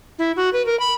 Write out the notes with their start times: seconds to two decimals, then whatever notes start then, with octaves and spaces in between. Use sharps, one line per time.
0.19 E4
0.36 F#4
0.53 B4
0.66 A#4
0.80 B5